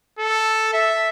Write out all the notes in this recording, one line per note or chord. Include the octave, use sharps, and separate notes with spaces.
A4
E5